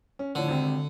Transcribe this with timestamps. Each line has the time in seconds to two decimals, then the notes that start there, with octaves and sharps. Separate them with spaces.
0.19 C#4
0.35 A2 D3 F3 C#5
0.48 G#1 C3 C4